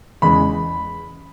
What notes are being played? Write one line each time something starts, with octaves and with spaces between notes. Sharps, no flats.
E2 C#3 E3 G#3 B5